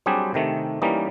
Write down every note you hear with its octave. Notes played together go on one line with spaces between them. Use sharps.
F#3 G3 C4 D4 G4 G#4
C3 D#3 A3
E3 G3 A#3 C#4 D#4